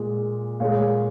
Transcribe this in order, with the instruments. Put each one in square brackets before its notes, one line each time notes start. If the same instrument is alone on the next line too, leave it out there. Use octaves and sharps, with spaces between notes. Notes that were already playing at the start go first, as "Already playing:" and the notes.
Already playing: [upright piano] A#2 G#3
A#2 G#3 C#5 F5